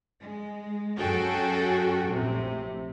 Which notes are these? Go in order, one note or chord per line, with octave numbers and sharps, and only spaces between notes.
G#3
F#2 C#4 F#4 G#4 A4 G5
A#1 A2 C3